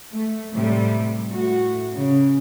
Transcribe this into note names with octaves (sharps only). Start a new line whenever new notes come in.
A3
A2 C3 G3
A2 F#4
C#3